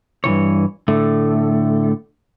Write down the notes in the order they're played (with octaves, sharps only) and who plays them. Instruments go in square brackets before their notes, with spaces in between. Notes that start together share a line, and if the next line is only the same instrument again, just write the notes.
[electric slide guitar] G2 C3 E3 C#5
A2 D3 A3